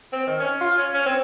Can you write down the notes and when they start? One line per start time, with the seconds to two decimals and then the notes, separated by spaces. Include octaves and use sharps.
0.13 C4
0.27 D#3
0.40 C#4
0.61 F4
0.77 C#4
0.94 C#4
1.06 C4